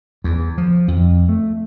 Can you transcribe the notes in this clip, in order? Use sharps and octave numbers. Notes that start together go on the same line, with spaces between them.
E2
F3
F2
A3